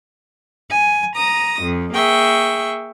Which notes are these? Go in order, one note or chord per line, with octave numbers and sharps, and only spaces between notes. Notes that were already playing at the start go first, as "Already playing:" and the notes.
G#5
A#5 D#6 A#6
F2
A#3 G#4 E5 G5 C#6